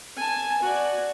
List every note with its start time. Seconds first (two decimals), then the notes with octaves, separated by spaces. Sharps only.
0.17 G#5 A5
0.62 F#4 D5